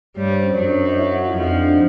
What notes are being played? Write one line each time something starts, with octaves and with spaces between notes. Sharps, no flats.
G2 G3 C#5
C5
C#4 C#5
F#2 F#3 D4 D5
D#5
E4 E5
F#4 F#5
F4 F5
F2 F3 D#4 D#5
D4 D5
D4 D5